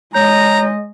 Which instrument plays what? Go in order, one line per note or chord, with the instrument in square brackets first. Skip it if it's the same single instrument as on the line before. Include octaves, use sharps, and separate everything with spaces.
[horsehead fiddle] G#3 D#5 [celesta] C#5 G6 [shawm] A#5